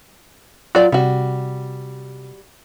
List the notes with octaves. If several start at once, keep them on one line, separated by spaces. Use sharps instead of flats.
F#3 F4 D5
C3 G3 F#4